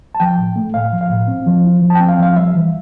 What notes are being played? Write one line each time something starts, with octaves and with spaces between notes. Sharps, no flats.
A5
F3 G5
A2
A3
A2 F5
F3
F5
A2
C4
F3
E4
F3
A5
C4 G5
F5
F3 F5
G3 E5
E3